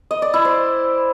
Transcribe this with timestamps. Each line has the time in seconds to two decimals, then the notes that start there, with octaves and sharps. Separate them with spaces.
0.11 D#5
0.22 D5
0.34 E4
0.45 C5